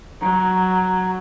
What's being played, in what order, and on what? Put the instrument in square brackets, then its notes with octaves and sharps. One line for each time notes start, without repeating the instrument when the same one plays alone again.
[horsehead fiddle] F#3 [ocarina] A#5